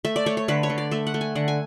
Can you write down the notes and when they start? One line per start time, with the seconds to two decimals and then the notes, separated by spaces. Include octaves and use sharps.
0.05 A3 E5
0.16 D5
0.26 A3 C#5
0.37 C#5
0.48 D3 B4
0.63 C#5
0.70 D3
0.78 D5
0.91 A3 E5
1.07 F#5
1.14 A3
1.21 G#5
1.35 D3 F#5
1.48 G#5